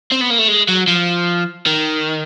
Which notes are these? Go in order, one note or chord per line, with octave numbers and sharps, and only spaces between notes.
C4
B3
A#3
A3
G#3
F#3
F3
D#3